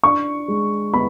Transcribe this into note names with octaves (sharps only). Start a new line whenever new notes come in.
D4 C#6
G#3
B3 B5